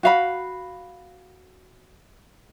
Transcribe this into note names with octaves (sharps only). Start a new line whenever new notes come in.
F#4 F5 B5